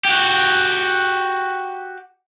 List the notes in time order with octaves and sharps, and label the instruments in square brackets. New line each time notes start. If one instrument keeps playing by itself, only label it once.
[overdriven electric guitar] F#4 G4